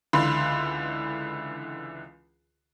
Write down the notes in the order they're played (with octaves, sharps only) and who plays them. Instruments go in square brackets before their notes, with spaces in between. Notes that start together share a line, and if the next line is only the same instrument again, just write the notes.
[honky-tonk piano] C#2 D3 E3 B5 C6